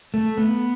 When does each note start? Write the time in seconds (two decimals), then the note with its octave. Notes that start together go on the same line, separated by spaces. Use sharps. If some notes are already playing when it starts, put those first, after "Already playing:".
0.14 A3
0.37 B3